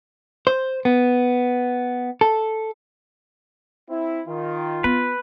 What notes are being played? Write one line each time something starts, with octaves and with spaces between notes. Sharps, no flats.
C5
B3
A4
C4 E4
D#3 F4
B3 B4